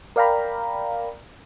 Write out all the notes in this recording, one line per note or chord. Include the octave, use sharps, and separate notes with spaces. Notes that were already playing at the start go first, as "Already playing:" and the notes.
A#4 D5 F5 G5 A#5 B5